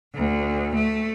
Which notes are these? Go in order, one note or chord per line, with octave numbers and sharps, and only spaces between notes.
D2
A3